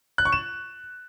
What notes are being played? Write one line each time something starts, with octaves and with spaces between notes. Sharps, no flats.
F#6
C#6
E7